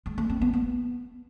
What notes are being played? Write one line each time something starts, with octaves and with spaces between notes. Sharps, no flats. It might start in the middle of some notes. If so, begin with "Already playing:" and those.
G#3
A3
C4
B3
B3